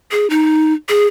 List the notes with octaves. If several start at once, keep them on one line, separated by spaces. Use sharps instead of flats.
G#4
D#4
G#4